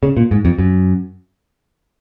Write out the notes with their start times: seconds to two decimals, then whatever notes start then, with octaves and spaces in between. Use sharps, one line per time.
0.03 C#3
0.17 A#2
0.31 G#2
0.45 F2
0.59 F#2